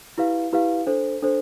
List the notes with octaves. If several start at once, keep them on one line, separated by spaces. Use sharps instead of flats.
E4 G4 B4 F5
E4 G4 B4 F5
D4 A4 C5
D4 A4 C5